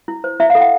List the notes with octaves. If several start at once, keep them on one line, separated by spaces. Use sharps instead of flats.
E4
C5
E4 E5
F5
A4
F#5